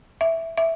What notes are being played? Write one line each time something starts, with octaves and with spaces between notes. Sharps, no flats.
E5
E5